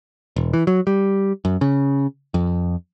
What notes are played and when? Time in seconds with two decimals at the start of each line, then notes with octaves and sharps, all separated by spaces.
0.36 E1
0.54 E3
0.67 F#3
0.87 G3
1.45 F#2
1.61 C#3
2.34 F2